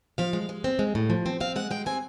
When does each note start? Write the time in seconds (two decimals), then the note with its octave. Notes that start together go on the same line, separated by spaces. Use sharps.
0.18 F3 F5
0.33 G#3
0.49 G#3
0.64 C4
0.79 G#3
0.95 A2
1.10 F3
1.26 C4
1.40 C4 F5
1.56 G#3 F#5
1.71 G#3 G5
1.86 C4 G#5